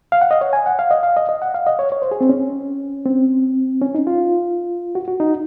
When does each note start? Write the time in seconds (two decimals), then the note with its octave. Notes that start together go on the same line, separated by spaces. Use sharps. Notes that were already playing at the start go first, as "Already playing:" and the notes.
0.12 F5
0.21 F#5
0.31 D#5
0.41 C#5
0.53 G#5
0.66 F#5
0.79 F5
0.91 D#5
1.03 F5
1.17 D#5
1.29 D#5
1.42 F#5
1.54 F5
1.67 D#5
1.79 C#5
1.92 C#5
2.02 C5
2.11 G#4
2.21 C4
2.29 C#4
3.06 C4
3.82 C#4
3.95 D#4
4.07 F4
4.95 F#4
5.08 F#4
5.20 D#4